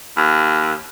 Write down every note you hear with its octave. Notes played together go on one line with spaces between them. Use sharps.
D#2